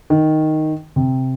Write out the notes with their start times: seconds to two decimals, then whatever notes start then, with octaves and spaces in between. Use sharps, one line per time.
0.10 D#3
0.96 C3